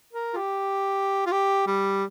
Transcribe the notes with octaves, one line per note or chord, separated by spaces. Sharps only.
A#4
F4
G4
F4
G4
G3